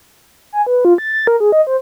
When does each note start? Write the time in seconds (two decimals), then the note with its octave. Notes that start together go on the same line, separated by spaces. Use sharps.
0.53 G#5
0.67 B4
0.85 F4
0.98 A6
1.13 A6
1.27 A#4
1.40 G#4
1.52 D#5
1.67 C5